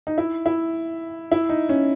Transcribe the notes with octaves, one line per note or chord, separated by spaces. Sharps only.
D#4
E4
E4
E4
D#4
C#4